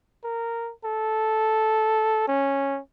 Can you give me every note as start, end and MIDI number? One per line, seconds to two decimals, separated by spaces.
0.24 0.71 70
0.85 2.27 69
2.28 2.79 61